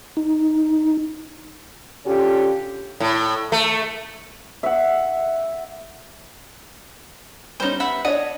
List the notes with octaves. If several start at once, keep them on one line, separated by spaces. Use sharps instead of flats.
D#4
D3 C#4 F4 G4
A2
A3
E5 F#5
G3 B3 C#4 D#4 C5
E5 F#5 B5
D4 C#5 D#5 F#5